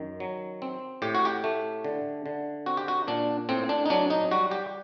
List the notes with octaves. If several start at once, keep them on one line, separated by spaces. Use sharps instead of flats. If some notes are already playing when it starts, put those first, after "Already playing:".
Already playing: F#2 D#3
F#3
C4
A2 G4
F#4
G4
A3
D3
D3
C4 F#4
G4
F#4
A#2 D4
A2 C4
D4
D#4
F#3 D4
D#4
G3 F#4
G4